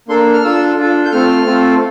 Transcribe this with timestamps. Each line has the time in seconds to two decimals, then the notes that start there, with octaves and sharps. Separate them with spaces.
0.08 A#3 D4 A4 C6
0.33 F6
0.44 D4 F4 A4 E6
0.78 D4 F4 A4
1.05 G6
1.12 A3 C4 F4 A4 F6
1.46 A3 C4 F4 A4